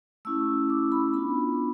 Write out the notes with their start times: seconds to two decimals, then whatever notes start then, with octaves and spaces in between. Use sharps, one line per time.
0.25 A3 C#4 E4 E6
0.70 D6
0.92 B5
1.13 B3 D4 F4 B5